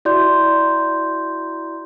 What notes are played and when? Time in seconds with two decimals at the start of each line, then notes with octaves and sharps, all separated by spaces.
0.05 E4 F#4 D5 C6 G6